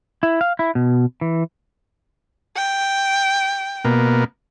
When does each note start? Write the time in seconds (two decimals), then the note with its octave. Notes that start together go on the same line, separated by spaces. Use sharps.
0.23 E4
0.41 F5
0.59 E4
0.75 B2
1.21 E3
2.56 G5
3.85 B2 A#3